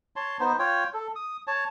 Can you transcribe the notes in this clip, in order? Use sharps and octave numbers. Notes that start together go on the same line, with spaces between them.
C#5 A5 C6
B3 D#4 C5
F4 C#5 G5
A4
D#6
C#5 A5